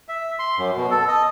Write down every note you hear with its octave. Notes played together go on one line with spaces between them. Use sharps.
E5
C6
F#2
B2
A4
D#5